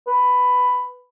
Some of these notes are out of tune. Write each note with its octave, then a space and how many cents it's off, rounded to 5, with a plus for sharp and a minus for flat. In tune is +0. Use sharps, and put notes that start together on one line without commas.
B4 +10